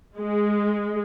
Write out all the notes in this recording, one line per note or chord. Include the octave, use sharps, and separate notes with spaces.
G#3